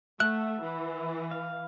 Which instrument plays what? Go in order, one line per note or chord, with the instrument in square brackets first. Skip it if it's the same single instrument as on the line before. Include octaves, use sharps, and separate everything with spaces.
[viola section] A3 [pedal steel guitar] E5 F#5 [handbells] F#6
[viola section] E3
[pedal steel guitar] F5